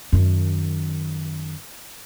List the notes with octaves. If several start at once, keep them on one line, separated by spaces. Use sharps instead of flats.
F#2 D#3